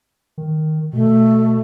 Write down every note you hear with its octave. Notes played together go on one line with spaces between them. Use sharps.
D#3
B2 A3